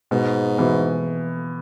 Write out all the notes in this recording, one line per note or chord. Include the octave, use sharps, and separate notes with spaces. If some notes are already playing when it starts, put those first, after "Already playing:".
G#2 B2
B2 E3